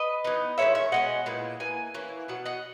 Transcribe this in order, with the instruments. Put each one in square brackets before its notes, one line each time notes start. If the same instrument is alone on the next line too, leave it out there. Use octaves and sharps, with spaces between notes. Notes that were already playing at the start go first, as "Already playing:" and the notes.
Already playing: [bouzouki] B4 D#5
E3 B3 D#4
D#3 G#3 C#4 E4 C#5 E5
C#5 E5
B2 G#3 C#4 D#5 F#5
A#2 G#3 B3 E4
E3 A#3 G#5
E3 A#3 C#4 E4
B2 F#3 F#5
D#5 F#5